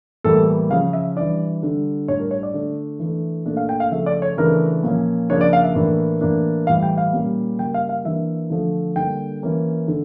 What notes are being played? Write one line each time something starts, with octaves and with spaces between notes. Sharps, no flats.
A2 E3 G3 A#3 A4
C#3 F3 C#4 F5
E5
E3 G3 D4 D5
D3 G3 D4
A2 G3 D4 C#5
A#4
C#5
D5
D3 A3 D4
E3 A3 D4
A#2 A3 D4
F5
G5
F5
C#3 F3 A3 E5
D5
C#5
C#3 E3 A3 D4 A#4
A#2 F3 C#4
C#3 F3 A#3 D4 C#5
D5
F5
E5
A2 E3 A#3 D4
A2 E3 A#3 D4
A2 E3 G3 F5
G5
F5
A#2 G3 C#4
C#3 G3 A#3 G5
F5
F5
E3 A#3 D4 E5
D3 F3 A3
D3 G3 A#3 D4 G5
E3 A#3 C#4
D3